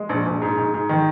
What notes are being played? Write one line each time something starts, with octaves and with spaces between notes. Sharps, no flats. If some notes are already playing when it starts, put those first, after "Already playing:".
Already playing: G#3
A#1
A#1
G#2
G#2
G#2
D#3